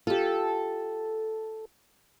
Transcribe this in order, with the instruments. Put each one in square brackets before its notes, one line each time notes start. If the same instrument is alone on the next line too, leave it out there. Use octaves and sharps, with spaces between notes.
[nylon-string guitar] F4 G4 [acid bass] A4